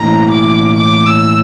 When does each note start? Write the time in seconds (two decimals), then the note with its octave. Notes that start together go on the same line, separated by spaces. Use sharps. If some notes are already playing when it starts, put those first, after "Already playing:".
Already playing: A2 E3 A#3 C#4 A#5
0.31 D6
0.76 D6
1.06 E6